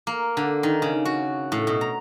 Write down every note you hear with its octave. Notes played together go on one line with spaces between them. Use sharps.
A#3
D3
D#3
C#3
F#4
A2
B2
A#5